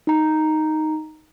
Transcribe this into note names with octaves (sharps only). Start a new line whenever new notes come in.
D#4 A#5